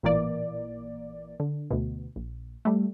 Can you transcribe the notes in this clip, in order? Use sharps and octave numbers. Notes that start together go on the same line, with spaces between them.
A1 A#2 E3 A#3 D5
D3
D2 B2
A#1
G3 A3